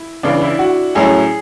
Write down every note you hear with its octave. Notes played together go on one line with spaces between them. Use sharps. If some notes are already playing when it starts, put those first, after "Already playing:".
Already playing: E4
C#2 C#3 E3 D4
E4
F#4
A2 F#3 C#4 E4 G#4